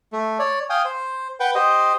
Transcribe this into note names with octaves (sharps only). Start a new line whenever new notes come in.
A3
C#5 D5
F5 G5 G#5 D#6
C5
B4 F#5 G5
G4 C5 D#5